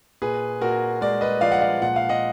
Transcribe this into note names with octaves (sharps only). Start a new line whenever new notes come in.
A#2 G#4 B4
A#2 F#4 A#4
G#3 A#4 D5
B4 D#5
F3 D5 F5
F#5
D5 F5
A#2 F#5
F5
D#5 F#5